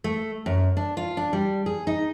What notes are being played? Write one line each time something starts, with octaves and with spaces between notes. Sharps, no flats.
A3
F#2
D4
F4
D4
G3
G#4
D#4